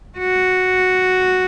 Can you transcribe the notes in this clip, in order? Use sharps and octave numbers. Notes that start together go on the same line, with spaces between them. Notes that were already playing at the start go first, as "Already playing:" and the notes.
F#4